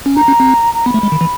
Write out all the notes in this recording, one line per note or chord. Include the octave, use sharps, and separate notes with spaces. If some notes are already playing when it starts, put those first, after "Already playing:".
C#4
D4 A#5
C#4
C4
A#5
B3 B5
A3
G#3
D#3
E3